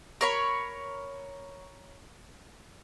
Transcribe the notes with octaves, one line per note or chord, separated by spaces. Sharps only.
A#4 C#5 B5